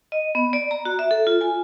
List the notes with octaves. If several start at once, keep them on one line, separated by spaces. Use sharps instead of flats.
D#5
B3
D5
A#5
F#4
E5
A4
F4
G#5